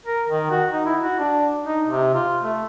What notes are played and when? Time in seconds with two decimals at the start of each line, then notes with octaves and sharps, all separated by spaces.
0.05 A#4
0.28 D#3
0.51 F#4
0.73 D#4
0.85 E4
1.02 F#4
1.19 D4
1.65 D#4
1.87 C3
2.14 F4
2.43 A3